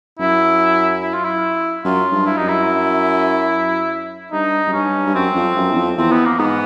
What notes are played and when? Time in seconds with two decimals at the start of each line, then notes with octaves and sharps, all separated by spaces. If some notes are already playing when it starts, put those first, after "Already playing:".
0.19 F#2 E4
1.02 E4
1.14 F4
1.25 E4
1.84 F#2 F4
2.12 G2
2.26 E4
2.37 F#2 D#4
2.48 E4
4.32 G2 D#4
4.67 F#2
4.73 G2 C#4
5.07 G2
5.15 F#2 C4
5.35 F2
5.57 F#2
5.71 E2
5.77 F2
5.97 E2 C4
6.12 B3
6.25 A#3
6.39 G#2 B3